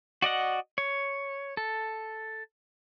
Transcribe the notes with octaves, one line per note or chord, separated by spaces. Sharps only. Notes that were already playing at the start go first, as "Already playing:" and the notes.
F#4 D5 D#5 F#5
C#5
A4